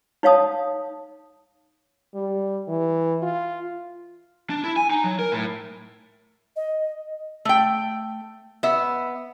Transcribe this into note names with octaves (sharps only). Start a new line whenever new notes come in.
D#4 C#5 F5 A5 D#6
G3
E3
F4
D4
E4
G#5
D#4
F#3
A#4
A2
D#5
A3 G5
B3 E5